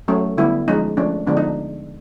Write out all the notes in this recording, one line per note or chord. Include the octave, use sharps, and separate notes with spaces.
F#3 A3 C#4
D3 G3 B3 E4
F3 G#3 C#4 D#4
F3 A3 C#4 D4
D3 F3 G#3 B3 D4
D#4